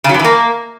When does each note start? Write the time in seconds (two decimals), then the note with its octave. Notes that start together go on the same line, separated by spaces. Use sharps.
0.04 C#3
0.09 F#3
0.14 G2
0.19 E3
0.24 A#3